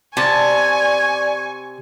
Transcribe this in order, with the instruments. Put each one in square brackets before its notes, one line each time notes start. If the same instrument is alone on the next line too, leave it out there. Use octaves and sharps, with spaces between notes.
[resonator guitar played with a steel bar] C3 [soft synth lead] D5 [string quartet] G#5 C#6 [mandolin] A5